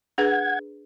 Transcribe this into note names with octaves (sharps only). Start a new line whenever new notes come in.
D4 G#4 B4 F#5 G#6